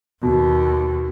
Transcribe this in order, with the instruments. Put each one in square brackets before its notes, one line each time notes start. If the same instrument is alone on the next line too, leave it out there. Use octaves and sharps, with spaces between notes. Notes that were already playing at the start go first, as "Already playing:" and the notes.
[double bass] D#2 [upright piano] B2